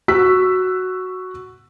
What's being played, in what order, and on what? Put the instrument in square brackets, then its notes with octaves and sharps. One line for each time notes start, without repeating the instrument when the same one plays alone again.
[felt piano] F#4 E6 B6